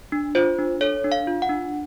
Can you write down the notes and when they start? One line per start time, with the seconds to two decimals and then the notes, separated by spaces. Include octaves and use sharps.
0.12 D4
0.35 F4 C5
0.59 D4
0.81 A4 C#5
1.04 D4
1.12 F5
1.27 F4
1.42 F#5
1.49 D4